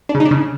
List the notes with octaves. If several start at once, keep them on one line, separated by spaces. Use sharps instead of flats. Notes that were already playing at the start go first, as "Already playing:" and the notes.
D4
C#3
D#4
D4
C#3